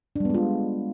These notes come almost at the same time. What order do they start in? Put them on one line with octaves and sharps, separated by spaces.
D4 G3 B3 G#3 F4